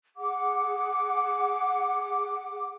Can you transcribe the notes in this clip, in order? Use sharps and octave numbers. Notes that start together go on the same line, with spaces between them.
G#4 F#5 D6